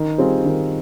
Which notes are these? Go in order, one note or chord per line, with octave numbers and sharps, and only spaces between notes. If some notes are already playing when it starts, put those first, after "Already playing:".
Already playing: D#3
G3 C4 F4 G#4
D#3